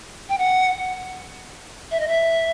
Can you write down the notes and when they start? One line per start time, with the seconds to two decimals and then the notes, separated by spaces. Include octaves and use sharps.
0.29 G5
0.38 F#5
1.91 E5
2.00 D#5
2.08 E5